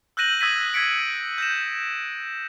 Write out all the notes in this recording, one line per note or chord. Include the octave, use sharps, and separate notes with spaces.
E6 F#6 G6 A#6 D#7 F#7
D#6 E6 G#6 B6 D#7 F#7
G#6 A#6 B6 C#7 D7
G6 A#6 E7